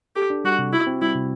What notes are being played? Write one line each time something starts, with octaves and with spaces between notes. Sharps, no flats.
G4 A4
D4
G3 F#4
C3
E4 F#4
C4
G3 E4
C3